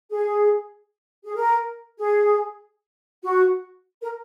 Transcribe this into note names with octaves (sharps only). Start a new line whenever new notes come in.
G#4
G#4
A#4
G#4
F#4
A#4